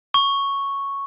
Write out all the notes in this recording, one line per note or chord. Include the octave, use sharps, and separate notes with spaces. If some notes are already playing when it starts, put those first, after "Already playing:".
C#6